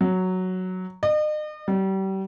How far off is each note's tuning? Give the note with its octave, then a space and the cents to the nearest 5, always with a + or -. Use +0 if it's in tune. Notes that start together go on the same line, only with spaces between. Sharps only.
F#3 +0
D#5 -40
G3 -35